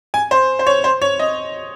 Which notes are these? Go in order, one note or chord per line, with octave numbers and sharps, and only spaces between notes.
G#5
C5
C5
C#5
C5
C#5
D#5